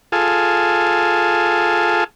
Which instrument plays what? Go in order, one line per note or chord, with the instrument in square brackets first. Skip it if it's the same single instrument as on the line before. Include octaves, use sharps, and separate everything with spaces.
[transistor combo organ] F4 G#4 A4